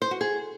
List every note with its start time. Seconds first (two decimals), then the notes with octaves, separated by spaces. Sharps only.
0.02 C5
0.11 F#4
0.21 G#4